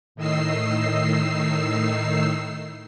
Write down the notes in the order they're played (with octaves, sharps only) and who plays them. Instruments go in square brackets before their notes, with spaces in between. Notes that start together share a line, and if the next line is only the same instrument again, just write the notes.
[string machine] A2 D#3 D#4 E6 C7